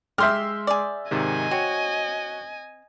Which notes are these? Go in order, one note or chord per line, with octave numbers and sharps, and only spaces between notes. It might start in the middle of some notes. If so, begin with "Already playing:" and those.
G#3 G4 E5 C6 F6 G6
G#4 D5
G#2 C3 D#3 D#5 G#5
C4 F#4 C#5